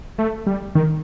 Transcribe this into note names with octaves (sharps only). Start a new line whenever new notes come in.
A3
G3
D#3